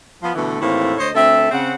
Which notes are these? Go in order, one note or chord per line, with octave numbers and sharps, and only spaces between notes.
F3 B3
B2 D3 E3 A3
D#2 A2 E3 A3 C4 F5
D2 C5 C#5 D#5
D2 C4 A4 E5
C#3 C4 F#5